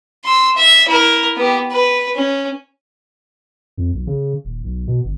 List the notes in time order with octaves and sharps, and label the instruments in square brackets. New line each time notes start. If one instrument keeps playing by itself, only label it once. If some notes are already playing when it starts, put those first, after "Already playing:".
[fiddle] C6 E6
E5
E4 A#4
B3 G4
B4
C#4
[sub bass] F2
B1
C#3
D#1
B1
B2
G1